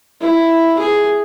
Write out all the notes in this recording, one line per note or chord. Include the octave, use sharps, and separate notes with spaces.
E4
G#4